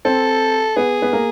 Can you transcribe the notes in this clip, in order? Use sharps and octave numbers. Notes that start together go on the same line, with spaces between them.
C4 A4
B3 G#4
B3
A#3